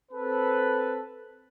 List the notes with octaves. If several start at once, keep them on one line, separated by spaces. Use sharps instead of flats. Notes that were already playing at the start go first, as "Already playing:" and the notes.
C4 A4 B4